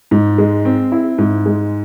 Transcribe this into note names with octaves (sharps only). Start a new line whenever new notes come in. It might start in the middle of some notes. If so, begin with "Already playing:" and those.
G#2
G#3
C4
E4
G#2
G#3